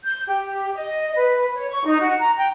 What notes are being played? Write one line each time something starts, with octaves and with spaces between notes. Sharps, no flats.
G6
G4
D#5
B4
C#5
C#6
D#4
F#4
A#5
G5